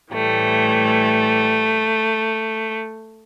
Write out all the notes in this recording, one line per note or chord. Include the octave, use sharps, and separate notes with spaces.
A2 E3 G3 A3